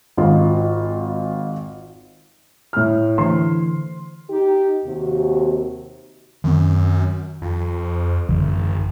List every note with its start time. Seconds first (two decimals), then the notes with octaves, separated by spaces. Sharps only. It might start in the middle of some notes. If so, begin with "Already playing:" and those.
0.17 G#1 F4 D#5
2.73 A2 F6
3.18 D3 E3 A3 C5 C6
4.30 D#4 G4
4.85 D#2 C3 F#4
6.44 F#2 D#3 C4
7.42 F2
8.29 G#1 F#2 D3 E3